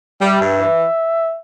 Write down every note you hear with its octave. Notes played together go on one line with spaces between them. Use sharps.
G3 E5
G2
E3